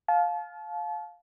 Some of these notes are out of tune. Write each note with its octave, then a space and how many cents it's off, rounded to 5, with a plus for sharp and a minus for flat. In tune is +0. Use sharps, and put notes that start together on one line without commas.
F5 +15 A5 -35